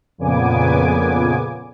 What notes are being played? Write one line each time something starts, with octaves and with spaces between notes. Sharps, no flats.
F2 A#2 C#3 B3 G#5 D6